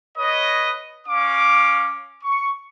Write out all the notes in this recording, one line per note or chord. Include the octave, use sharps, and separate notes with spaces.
B4 C#5 D#5
C#4 F5 D6
C#6